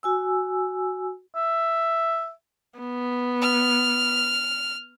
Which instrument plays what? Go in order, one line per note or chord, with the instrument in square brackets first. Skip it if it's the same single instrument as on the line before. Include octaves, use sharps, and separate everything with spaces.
[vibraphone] F#4 G#5 E6
[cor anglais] E5
[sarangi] B3
[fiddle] F6